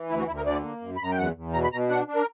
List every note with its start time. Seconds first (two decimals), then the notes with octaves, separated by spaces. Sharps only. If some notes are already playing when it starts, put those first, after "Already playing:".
Already playing: E3
0.09 D2 E4
0.19 F#4
0.27 D2 E4
0.37 A#4
0.46 D3 D5
0.63 A#3
0.81 F#2
0.96 B5
1.01 F#2 A#5
1.11 G5
1.18 E2 F#5
1.36 E2
1.54 B2 A#5
1.64 B5
1.72 B2 A#5
1.89 D4 F#5
2.08 D4
2.15 A#4